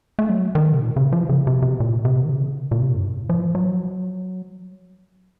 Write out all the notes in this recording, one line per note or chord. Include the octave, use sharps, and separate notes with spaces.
A3
F#3
D#3
C3
A#2
C#3
F3
C#3
C3
C3
A#2
C3
D#3
C#3
A#2
C3
F#2
A2
F3
F#3